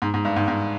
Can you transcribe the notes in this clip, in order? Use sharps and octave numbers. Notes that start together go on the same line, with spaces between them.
G#2
G#2
G2
G#2
G#2